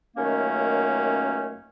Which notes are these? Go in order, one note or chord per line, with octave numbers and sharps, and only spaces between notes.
C#2 F#2 D#3 A3 A#3 C#4